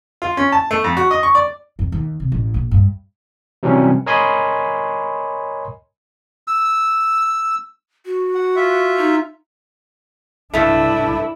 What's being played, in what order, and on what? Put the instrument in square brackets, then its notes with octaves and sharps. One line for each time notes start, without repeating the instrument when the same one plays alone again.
[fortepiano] F4
C#4
A5
A3
F2
F#4
D#5
C#6
D5
[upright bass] F2
D#2
C3
A1
A#1
G2
[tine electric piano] C3 E3 F#3 G3 C4 C#4
A#4 C#5 D#5 G#5 B5 C6
[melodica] E6
[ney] F#4
[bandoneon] F#5
F4 E5
[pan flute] D#4
[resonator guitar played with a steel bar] G2 A3 [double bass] D4 E4